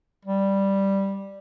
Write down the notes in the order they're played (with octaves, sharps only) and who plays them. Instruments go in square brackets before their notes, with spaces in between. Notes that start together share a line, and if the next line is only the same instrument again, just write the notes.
[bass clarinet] G3